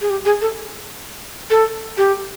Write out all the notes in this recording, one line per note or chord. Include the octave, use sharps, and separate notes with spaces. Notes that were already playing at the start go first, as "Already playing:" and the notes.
G#4
G4
G#4
A4
A4
G4